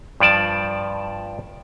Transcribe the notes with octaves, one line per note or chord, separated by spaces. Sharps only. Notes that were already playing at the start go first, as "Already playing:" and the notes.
G2 F3 D5 A5